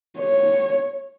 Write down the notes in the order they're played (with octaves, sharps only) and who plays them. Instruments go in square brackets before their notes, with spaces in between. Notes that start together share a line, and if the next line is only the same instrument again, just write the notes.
[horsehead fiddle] C#5